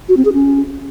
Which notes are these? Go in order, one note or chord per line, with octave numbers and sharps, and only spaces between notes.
F#4
C4
G#4
C#4